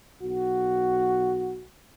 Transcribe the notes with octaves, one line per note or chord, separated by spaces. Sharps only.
B1 F#4